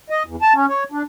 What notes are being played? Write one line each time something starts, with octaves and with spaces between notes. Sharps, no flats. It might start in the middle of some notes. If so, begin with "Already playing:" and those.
D#5
E2
A5
C#4
C#5
D4